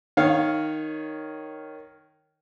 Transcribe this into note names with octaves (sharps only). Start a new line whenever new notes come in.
D#3 C#5 F5